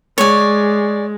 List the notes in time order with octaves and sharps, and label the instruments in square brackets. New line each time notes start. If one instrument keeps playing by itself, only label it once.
[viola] G#3 [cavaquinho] C#5 D5